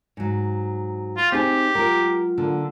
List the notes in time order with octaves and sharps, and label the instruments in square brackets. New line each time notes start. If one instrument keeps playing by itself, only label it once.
[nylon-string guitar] G#2 F#3
[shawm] F4
[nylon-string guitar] C4 D#4 G#4 [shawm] G4
[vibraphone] F#3 G#3 F4 [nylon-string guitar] A#4
[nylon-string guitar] D3 A#3